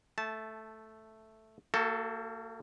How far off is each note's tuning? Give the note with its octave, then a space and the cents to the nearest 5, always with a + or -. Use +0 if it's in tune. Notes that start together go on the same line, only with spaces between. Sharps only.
A3 +0 A5 -15
A#3 -40 F#4 +15 A4 +0